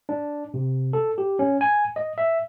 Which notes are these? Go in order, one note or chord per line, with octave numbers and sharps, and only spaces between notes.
D4
C3
A4
G4
C#4
G#5
D#5
E5